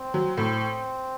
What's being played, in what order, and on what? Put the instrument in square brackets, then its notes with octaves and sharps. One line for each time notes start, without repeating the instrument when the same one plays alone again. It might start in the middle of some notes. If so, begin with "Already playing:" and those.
Already playing: [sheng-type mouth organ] C4
[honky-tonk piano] F#3
[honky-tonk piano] A2 [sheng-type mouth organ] C4